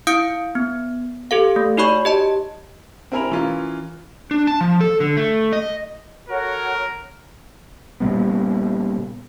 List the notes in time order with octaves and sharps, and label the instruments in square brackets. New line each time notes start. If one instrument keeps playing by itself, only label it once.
[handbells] E4 F5 D#6 G6 C#7 D7
B3
G4 A4 F5
A3
D#4 F#4 C#5 D5 B5 C#6
G4 D#5 A5
[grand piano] C4 E4 A#4 G#5 B5 F7
E3 C#4 F4 A#4
[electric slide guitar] D4
A5
F3
A4
D3
A3
D#5
[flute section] F#4 A4 C#5 [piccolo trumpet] A#4
[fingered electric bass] A#2 C#3 G3 B3